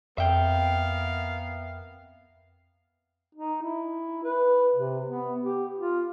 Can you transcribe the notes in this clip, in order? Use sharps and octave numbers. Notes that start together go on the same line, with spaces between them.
F2 B3 A#4 E5 F5 G5
D#4
E4
B4
C3
B3
G4
F4